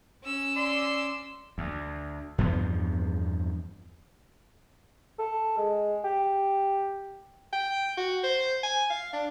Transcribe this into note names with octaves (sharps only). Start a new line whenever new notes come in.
C#4 E6
D5 C6
D2
E2 G2 F3 B3
A4
G#3
G4
G5
F#4
C5
G#5
F5
D4